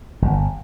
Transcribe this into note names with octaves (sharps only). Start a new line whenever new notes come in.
G1